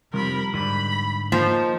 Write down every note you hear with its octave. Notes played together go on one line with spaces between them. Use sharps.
C3 F3 G3 A#4 B5
G#2 D3 B5
F3 A#3 D#4